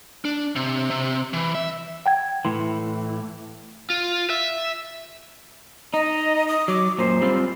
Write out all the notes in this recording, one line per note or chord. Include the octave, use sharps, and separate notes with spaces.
D4
C3
C3
E3
E5
F#5 G5 G#6
A2 E3 C6
F4
E5
D#4 D#5
D#6
F#3 D6
F#2 A#2 C5
G3 C4 F4